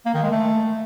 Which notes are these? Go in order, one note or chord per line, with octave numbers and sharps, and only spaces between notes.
A#3
D#3
G#3
A3